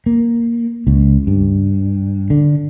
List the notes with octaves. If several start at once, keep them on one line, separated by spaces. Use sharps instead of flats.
A#3
C#2
G2
D3